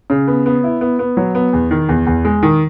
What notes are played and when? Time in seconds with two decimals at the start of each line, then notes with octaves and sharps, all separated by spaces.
0.10 C#3
0.28 B3
0.46 B3
0.64 E4
0.81 B3
0.99 B3
1.17 F#3
1.35 B3
1.53 E2
1.71 D#3
1.89 E2
2.07 E2
2.25 G#3
2.43 D#3